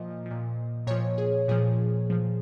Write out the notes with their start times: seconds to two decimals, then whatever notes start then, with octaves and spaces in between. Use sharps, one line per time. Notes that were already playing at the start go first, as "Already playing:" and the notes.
Already playing: A#2 F3 D#5
0.26 A#2 F3
0.87 A#2 F3 C#5
1.18 G#4
1.48 A#2 F3 G#4
2.10 A#2 F3